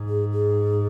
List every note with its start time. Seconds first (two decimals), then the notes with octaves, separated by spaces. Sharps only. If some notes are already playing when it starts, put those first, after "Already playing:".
Already playing: G#2
0.08 G#4
0.32 G#4